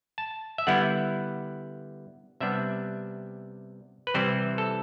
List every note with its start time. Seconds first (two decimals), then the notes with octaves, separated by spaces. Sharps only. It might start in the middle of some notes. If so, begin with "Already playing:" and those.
0.18 A5
0.58 E5
0.67 D3 G3 B3 E4 F#5
2.40 C3 G3 B3 D4 E5
4.07 B4
4.14 C3 E3 G3 C4 E4 C5
4.58 A4